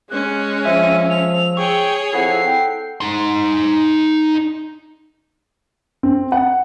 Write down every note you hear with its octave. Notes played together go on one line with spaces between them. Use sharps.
G#3 C#4 F#6
F3 E5 E6 D#7
F7
G#4 C#5 G5 C#6
F3 C4 E4 A4 F#5 C7
G5
D#4 C6
C4
F#5